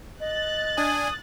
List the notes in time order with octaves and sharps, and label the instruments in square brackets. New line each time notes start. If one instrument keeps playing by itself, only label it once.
[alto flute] D#5 [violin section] F#6 A6
[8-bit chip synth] D4 G#5 [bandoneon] D#6